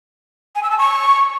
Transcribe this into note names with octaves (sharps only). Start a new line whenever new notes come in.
G#5
E6
A5
C#6